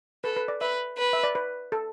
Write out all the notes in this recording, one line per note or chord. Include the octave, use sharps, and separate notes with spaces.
A4 B4
B4
D5
B4 E5
B4
E5
D5
B4
A4